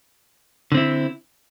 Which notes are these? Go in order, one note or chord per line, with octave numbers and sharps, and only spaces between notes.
D3 C4 E4